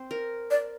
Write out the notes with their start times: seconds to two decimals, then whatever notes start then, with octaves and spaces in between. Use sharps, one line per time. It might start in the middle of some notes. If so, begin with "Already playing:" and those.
Already playing: C4 C5
0.11 A#4
0.51 D5